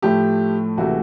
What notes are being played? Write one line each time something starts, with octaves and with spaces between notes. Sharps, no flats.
A2 F3 A3 G4
C#2 C3 E3 A3 F#4